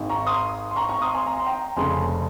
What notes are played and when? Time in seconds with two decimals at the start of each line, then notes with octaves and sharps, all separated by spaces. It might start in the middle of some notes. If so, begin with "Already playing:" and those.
Already playing: G#1 G#2 D#3
0.09 A#5 C#6
0.27 C6 D#6
0.71 C6
0.76 A#5 C#6
0.89 A#5 C#6
1.01 C6 D#6
1.14 G#5 C6
1.27 A#5
1.37 C6
1.46 G5 A#5
1.77 F1 F2 C#3 G#3 G#5 C6